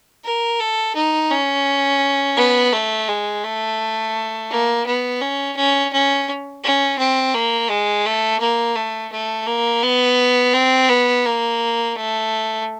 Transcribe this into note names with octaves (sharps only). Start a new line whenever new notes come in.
A#4
A4
D#4
C#4
B3
A3
G#3
A3
A#3
B3
C#4
C#4
C#4
C#4
C4
A#3
G#3
A3
A#3
A3
A3
A#3
B3
C4
B3
A#3
A3